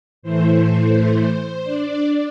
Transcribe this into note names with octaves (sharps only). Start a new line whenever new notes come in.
A2 E3 A3 C5
D4 D5